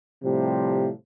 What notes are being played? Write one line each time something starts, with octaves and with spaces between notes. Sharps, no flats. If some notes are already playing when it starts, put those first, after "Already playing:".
A2 C3 F3 G3